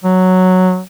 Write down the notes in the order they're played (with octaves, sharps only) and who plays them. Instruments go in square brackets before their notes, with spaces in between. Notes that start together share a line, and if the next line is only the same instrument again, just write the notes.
[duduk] F#3